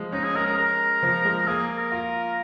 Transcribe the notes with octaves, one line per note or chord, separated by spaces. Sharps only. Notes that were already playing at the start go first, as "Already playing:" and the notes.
Already playing: F3 G#3
C#4 D#4
G#4
G#3 A#4
A#4
A#4
F3
G#3
A#3 G#4
A#4
F4